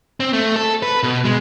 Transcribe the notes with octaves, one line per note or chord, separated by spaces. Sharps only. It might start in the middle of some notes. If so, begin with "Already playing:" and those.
C4
A3
A4
B4
B2
G#3